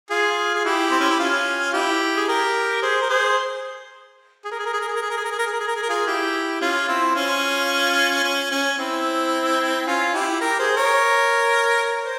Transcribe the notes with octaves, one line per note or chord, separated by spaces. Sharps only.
F4 G#4
G#4
E4 G4
C4
C#4
E4
C#4 F4
E4 G4
G#4
G4 A#4
G#4 C5
A#4
G#4 C5
G#4
A#4
G#4
A#4
G#4
A#4
G#4
A#4
G#4
A#4
G#4
A#4
G#4
A#4
G#4
A#4
G#4
A#4
G#4
A#4
F4 G#4
E4 G4
C#4 F4
C4 E4
C#4 F4
C#4
C#4
C4 E4
C#4 F4
E4 G4
G4 A#4
G#4 C5
A#4 C#5
C5